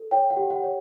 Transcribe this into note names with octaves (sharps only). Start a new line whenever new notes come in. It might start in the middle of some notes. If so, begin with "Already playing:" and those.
Already playing: A4
C#5 G5
F#5
G4
F#5
C#5